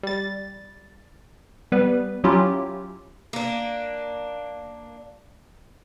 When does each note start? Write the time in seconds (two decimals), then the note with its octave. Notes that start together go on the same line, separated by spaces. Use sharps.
0.03 G3 A6
1.72 G3 B3 B4
2.24 F#3 C#4 E4 F4 G4
3.33 A#3 D4